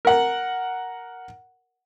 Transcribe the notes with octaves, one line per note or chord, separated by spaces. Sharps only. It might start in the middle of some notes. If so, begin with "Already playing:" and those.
A#4 F#5